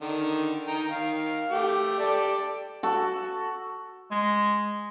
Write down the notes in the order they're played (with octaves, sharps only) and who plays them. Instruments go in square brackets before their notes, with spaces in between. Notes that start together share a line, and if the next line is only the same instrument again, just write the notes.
[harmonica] D3 D#3
D#4 G5 A#5
D#3 F5
A3 G4
G4 A4 D5
[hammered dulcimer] F#4 A4
[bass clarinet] G#3